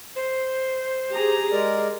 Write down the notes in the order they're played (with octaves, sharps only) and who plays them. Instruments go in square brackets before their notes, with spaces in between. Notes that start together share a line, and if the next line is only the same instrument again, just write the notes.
[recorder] C5
[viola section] G4 G#4 A#5
[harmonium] G#3 A#4 D5